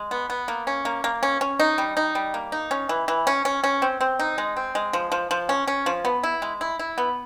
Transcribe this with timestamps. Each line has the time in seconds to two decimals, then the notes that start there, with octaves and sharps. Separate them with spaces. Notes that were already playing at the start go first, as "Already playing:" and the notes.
Already playing: G#3
0.11 B3
0.30 B3
0.48 A#3
0.67 C#4
0.85 A#3
1.04 A#3
1.23 C#4
1.41 C#4
1.60 D#4
1.78 G3
1.97 D#4
2.15 G3
2.34 A#3
2.52 D#4
2.71 C#4
2.89 E3
3.08 E3
3.27 C#4
3.45 C#4
3.64 C#4
3.82 C4
4.01 C4
4.19 D#4
4.38 G#3
4.57 C4
4.75 G#3
4.93 F3
5.12 F3
5.31 F3
5.49 C#4
5.68 C#4
5.86 F3
6.05 B3
6.23 E4
6.42 G#3
6.61 E4
6.79 E4
6.98 B3